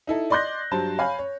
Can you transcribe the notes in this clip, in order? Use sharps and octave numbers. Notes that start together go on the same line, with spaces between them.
D#4 E4 A4
D5 D#5 C6 F#6 G6 A#6
G2 F#3 C5 A5
C#5 F5 G#5 B5
C#5